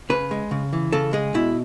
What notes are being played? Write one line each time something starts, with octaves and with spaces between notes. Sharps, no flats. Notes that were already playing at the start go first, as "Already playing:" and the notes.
C#3 B4
G#3
C#3
E3
C#3 A4
G#3 G#4
B2 E4